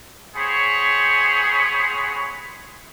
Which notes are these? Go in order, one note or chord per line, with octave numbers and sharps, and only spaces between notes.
C4 G#4 C5 C#5 F#5 B5